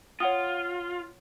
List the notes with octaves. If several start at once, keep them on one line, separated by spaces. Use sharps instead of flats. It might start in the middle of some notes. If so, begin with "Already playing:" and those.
F4 C#5 F#5 D#6